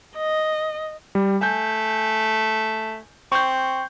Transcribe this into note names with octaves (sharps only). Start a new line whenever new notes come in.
D#5
G3
A3 G#5 G6
C4 C#6 G6